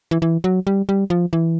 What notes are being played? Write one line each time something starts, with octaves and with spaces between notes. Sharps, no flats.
E3
E3
F#3
G3
G3
F3
E3